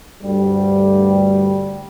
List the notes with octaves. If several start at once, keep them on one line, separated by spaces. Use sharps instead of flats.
D2 G2 G3